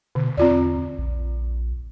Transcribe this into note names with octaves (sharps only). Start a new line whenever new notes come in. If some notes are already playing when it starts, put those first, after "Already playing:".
B2 D3
E2 C4 F4 D5
A#1